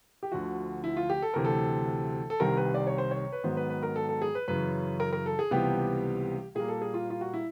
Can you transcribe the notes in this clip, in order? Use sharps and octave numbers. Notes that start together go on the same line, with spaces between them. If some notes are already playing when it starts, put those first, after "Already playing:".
G4
D2 D3 F3 F#4
E4
F4
G4
A4
D2 C3 E3 A#4
A4
A4
C2 C3 D#3 G3 A#4
B4
D5
C#5
C5
C#5
B4
G#2 D#3 F#3 B3 C5
B4
B4
A#4
A4
A4
G#4
B4
F#2 C#3 E3 B4
A#4
A#4
A4
G#4
C#2 C3 E3 G3 B3 G4
A#2 G3 A#3 G#4
A4
G#4
F4
F4
F#4
E4